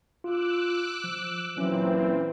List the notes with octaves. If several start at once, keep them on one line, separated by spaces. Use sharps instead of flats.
F4 D6 E6 F#6
F3
A#2 E3 F#3 C4 C#4